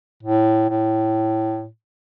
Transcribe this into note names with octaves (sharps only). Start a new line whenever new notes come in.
A2
A2